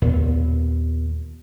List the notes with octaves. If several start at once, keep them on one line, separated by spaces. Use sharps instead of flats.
D#2 A#2 B3